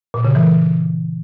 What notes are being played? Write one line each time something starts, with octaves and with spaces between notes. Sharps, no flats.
A#2
C#3
E3